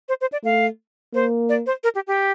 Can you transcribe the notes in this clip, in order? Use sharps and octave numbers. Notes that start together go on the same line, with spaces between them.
C5
C5
D5
A3 F5
A#3 C5
D5
C5
A#4
G4
G4